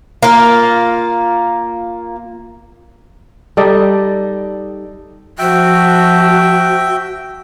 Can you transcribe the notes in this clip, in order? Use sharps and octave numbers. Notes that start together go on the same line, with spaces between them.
A#3 F4
G3 D#4 A4 D5
F3 F#4 E5 G5